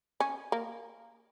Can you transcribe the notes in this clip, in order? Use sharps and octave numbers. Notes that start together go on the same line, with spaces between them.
C#4
A#3